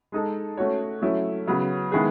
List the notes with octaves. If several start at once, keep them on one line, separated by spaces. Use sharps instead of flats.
G#3 D#4 A4
A3 C#4 F#4 C#5
F#3 A3 C#4 E4
C#3 F#3 B3
D#3 G#3 B3 E4 G#4